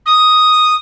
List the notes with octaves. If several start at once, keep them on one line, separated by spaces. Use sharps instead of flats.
D#6